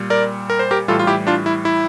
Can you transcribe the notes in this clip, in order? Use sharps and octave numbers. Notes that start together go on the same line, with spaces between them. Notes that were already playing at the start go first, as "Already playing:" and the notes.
Already playing: A#2 G3
A#4 D5
A#4
C5
G4 A#4
A2 E3 G3 F4 A4
F4
E4 G4
D4 F4
E4
E4